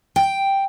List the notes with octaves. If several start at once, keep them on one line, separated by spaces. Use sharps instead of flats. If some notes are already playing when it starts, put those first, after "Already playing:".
G5